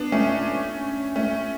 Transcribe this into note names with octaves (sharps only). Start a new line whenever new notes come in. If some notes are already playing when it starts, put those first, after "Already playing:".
Already playing: B3 D4
A3 C#4
A3 C#4